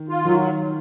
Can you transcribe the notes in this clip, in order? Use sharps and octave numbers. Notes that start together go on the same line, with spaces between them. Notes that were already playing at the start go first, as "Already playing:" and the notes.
Already playing: D#3
F4
D#3 F#3